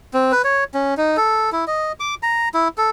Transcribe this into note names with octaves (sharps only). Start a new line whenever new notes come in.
C4
B4
C#5
C#4
D#4
A4
E4
D#5
D6
A#5
E4
A4